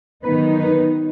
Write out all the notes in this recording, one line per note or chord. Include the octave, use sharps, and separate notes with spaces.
D#3 F#3 B3 D#4 B4
B4